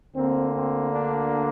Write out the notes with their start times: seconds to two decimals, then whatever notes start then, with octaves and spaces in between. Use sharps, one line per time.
0.15 D2 D3 A#3 C4
0.53 C4
0.91 D4